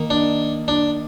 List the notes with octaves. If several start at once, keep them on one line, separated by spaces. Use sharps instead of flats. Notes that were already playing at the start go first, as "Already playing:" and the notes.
Already playing: D#3 A#3
D4
D4